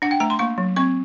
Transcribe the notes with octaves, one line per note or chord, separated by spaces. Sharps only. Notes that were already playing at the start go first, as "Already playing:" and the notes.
D4 F#5
G5
A3 A#5
C6
A#3 C#6
F#3
C4 C#6